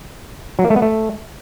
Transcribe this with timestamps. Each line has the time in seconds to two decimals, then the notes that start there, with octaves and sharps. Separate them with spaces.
0.59 F#3
0.64 A#3
0.70 A3
0.76 B3
0.82 A3